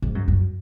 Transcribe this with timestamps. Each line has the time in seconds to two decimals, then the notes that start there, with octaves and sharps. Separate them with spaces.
0.02 G#2
0.15 F#2
0.28 F#2